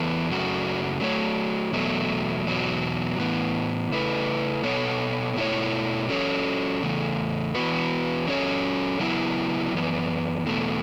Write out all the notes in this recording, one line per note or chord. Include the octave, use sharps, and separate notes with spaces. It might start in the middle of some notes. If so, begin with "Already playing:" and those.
Already playing: E2 E3 B3 A4
F#2 C#3 F#3 A3 F#4
F#3 A3 F#4 C#5
E2 B2 F#3 A3
E2 B2 F#3
A2 E3 B3
C#3 A3 E4 B4
B2 B3 A4 C#5
B2 A3 E4 C#5
F#3 C#4 A4 C#5
E2 C#3 A3
E3 B3 F#4 B4
F#3 C#4 A4 C#5
C#3 F#3 B3 E4
F#2 E3 B3
E2 B2 A3